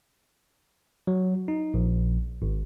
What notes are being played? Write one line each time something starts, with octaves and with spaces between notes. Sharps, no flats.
F#3
D#4
A#1
G#1